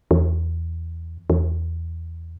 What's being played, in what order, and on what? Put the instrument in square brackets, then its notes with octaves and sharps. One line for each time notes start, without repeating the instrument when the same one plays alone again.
[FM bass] E2
E2